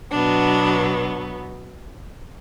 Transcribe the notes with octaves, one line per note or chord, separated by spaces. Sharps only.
B2 F#3 B3 D4